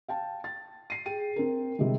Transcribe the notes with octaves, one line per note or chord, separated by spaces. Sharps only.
F5 G5 A5
A6
C7 D#7
G#4 G5 D#7
C4 A#4
C3 D#3 G3 G#3